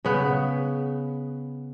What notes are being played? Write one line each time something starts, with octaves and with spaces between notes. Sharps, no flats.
C#3 B3